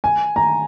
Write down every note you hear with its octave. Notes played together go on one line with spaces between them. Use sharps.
G#5
A#5